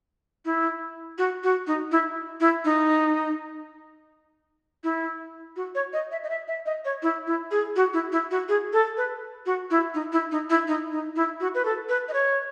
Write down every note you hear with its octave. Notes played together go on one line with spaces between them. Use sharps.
E4
F#4
F#4
D#4
E4
E4
D#4
E4
F#4
C#5
D#5
E5
D#5
E5
E5
D#5
C#5
E4
E4
G#4
F#4
E4
E4
F#4
G#4
A4
B4
F#4
E4
D#4
E4
D#4
E4
D#4
D#4
E4
F#4
B4
A4
B4
D#5
C#5